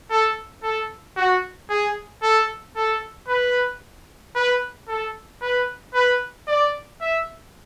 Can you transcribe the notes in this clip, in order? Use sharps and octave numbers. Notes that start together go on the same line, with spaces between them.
A4
A4
F#4
G#4
A4
A4
B4
B4
A4
B4
B4
D5
E5